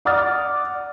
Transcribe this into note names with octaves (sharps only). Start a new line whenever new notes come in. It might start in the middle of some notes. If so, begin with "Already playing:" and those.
D5 F#5 D6 D#6 F6 A6